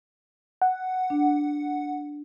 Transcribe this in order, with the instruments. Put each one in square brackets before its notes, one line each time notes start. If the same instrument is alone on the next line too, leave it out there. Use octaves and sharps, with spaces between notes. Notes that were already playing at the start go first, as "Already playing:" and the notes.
[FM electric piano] F#5
[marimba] D4